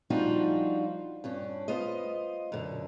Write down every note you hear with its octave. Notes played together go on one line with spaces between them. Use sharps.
F3 G3 D4 D#4 F4 F#4
G2 C#4 D4
B3 F4 C5 D#5
F#2 B2 D3